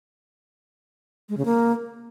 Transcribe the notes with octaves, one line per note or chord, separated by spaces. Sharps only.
G#3
C#3
A#3